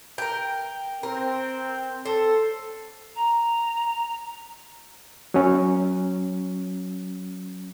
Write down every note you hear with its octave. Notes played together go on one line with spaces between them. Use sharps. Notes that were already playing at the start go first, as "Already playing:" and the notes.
A#4 G5
C4 A#4
A4 C5
A#5
F#3 C#4